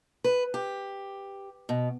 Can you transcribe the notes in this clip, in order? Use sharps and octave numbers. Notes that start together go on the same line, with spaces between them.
B4
G4
B2